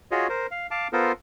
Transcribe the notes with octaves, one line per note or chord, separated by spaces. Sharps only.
F4 F#4 G#4 C#5 D#5
A#4 C5
F5
F5 A5 D6
B3 F4 A4 A#4 C5